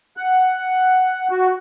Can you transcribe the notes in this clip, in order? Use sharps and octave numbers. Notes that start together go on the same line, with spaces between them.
F#5
F#4